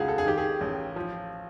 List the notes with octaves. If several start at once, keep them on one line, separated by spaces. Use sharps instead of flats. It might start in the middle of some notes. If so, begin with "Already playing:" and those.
Already playing: C#2 F4 F#4 G#4
A4
G#4
D#3 G4
G#4
A1
F3